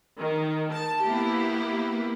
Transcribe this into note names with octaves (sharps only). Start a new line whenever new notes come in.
D#3
A5
A#3 B3 E4 G4